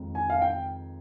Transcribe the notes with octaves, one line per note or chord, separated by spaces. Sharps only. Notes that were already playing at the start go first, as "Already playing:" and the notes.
Already playing: F2 D#3 G#3 D#4
G#5
F5
G5